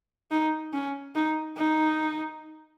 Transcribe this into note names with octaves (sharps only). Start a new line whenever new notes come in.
D#4
C#4
D#4
D#4